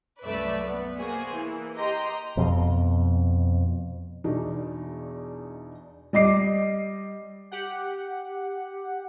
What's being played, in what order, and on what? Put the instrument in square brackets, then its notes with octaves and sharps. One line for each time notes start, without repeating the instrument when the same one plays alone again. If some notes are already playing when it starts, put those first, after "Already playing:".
[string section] C2 F#2 A3 B4 D5 E5
B3
A#3 F#4 G#4 C5
E3 A#3
G4 D#5 G5 A#5 C6
[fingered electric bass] F2 B2
[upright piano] E2 B2 D4 D#4
G3 D#5 D6 C7
[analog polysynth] G4 F#5